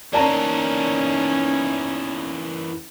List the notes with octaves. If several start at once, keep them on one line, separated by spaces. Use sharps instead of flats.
E2 A#3 C#4 D#4 D5 A5 A#5